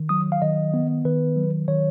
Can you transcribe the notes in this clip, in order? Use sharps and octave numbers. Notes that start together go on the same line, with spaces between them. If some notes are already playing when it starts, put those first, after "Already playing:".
Already playing: D#3
F#3 D#6
F5
D#3 D#5
B3
D#3 B4
F#3
D#3 C#5